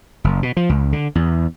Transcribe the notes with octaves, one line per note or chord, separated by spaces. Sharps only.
F#1
B2
F3
C#2
D3
E2